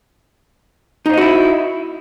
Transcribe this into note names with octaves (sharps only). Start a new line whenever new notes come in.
D#4 E4 F#4 C5 D#5